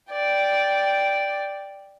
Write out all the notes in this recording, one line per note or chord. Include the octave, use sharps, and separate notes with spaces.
D5 G5